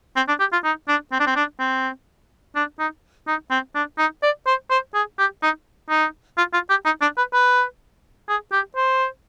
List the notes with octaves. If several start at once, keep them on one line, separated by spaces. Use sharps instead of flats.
C4
D4
G4
F4
D#4
D4
C4
D4
C4
D4
C4
D4
D#4
D#4
C4
D4
D#4
D5
C5
C5
G#4
G4
D#4
D#4
F4
F4
G4
D#4
D4
B4
B4
G#4
G4
C5